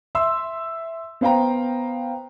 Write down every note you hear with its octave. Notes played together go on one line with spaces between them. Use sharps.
E5 C6 E6
B3 C5 F5 G5 A#5